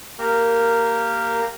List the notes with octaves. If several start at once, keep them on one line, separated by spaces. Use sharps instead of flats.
A#3 G4 A#4